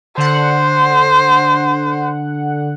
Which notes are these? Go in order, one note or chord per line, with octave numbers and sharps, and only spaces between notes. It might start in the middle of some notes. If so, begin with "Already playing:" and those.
D3 C5 F#5